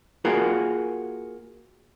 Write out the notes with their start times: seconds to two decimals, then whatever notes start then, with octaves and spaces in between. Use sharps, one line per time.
0.25 A#3 F4 F#4 G#4 A#4